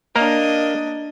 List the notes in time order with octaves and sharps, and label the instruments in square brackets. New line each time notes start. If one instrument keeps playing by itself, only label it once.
[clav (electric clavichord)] A#3 A#4 [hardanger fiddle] D4 D#5